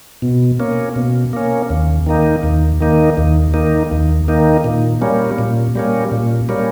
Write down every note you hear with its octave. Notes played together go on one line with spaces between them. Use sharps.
B2
A#3 C#4
B2
A#3 C#4
D#2
D#3 A#3 D#4
D#2
D#3 A#3 D#4
D#2
D#3 A#3 D#4
D#2
D#3 A#3 D#4
A#2
G3 A#3 C#4
A#2
G3 A#3 C#4
A#2
G3 A#3 C#4